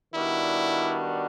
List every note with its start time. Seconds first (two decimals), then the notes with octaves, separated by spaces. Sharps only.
0.14 D#3 G3 B3 D4 E4 F#4